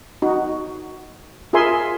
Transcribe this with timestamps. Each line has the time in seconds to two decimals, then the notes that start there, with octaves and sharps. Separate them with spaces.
0.22 D#4 F#4
1.53 F4 G#4 A#4 E5 G#5 C6